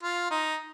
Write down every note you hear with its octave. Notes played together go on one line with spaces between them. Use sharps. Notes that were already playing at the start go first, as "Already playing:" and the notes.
F4
D#4